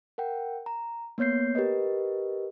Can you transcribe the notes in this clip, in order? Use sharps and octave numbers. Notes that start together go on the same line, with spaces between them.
A#4 F#5 G5
A#5
A#3 B3 C#5 G6 C7
G4 A#4 B4 D#5